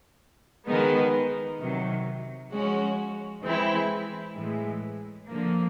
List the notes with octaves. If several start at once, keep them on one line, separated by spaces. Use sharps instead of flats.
D#3 G#3 B3 D#4
C3 D#3 F#3
F3 G#3 C#4 F#4
E3 G#3 C4 E4
A2 E3 G#3
D3 F3 A#3